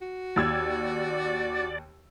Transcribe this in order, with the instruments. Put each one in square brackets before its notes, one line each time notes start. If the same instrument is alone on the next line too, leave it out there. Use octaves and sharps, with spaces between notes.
[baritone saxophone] F#4
[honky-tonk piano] D#2 E6 G#6 [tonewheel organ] D5